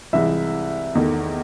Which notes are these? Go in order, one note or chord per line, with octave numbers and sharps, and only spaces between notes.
C2 C3 E3 G#3 E5
E2 D#3 A3